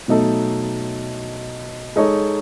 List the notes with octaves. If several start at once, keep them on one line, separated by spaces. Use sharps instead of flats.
B2 F#3 A3 D#4 A4
G#3 D#4 A4 C#5